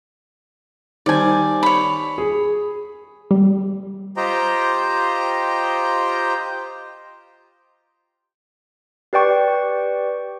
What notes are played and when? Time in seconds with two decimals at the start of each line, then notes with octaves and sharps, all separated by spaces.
1.06 D#3 G3 C5 D5 G#5
1.63 C#5 B5
2.18 G#4
3.31 G3
4.17 F4 G4 C5 D#5 G5 A#5
9.13 G4 B4 D5 G5 C#6